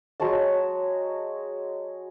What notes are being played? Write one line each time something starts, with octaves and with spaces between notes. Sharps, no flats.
F#3 G#3 C#5 A5